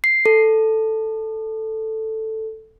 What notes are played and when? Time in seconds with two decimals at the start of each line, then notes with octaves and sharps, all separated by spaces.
0.04 C7
0.26 A4